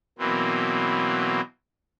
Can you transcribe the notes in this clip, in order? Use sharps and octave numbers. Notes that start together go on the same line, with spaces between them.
B2 E3 F#3 A#3 C4